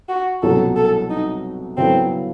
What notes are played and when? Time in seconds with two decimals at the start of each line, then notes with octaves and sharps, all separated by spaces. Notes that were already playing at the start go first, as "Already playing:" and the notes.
0.09 F#4
0.43 C2 B2 F#3 A3 C#4 A4
0.76 A4
1.10 D#4
1.77 C#3 F#3 B3 C4 E4 A4